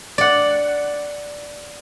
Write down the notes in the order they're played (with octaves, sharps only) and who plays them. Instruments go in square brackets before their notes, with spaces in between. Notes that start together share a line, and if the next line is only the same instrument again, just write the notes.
[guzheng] D5 F#5